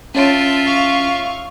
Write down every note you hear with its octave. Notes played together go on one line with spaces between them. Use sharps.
C#4 F4 C#5 E5 A5 D7
F5 C#6